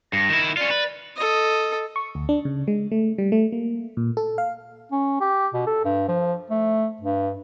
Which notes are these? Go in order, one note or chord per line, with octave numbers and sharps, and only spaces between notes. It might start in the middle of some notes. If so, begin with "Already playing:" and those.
G2 A#6
D#3 E4
C#4 F4 D5
B4
A4 D#5
C#6
D2
D4
C#3
G#3
A3
G3
A3
A#3
A#2
A4
F5
C#4
G4
B2
A4
G2
F3
A3
G2